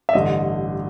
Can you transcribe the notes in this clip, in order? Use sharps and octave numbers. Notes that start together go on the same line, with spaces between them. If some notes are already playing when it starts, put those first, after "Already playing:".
E5
A1 G2 D3 D#5